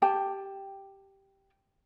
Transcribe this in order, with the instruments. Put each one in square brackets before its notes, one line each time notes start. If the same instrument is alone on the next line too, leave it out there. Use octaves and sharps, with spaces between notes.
[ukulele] G4 G5 A5